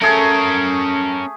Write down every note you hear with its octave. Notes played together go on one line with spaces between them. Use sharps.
A3 C#4 G#4 A#4